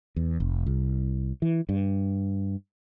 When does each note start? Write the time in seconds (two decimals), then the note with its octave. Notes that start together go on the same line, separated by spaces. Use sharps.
0.16 E2
0.40 F1
0.66 C2
1.42 E3
1.69 G2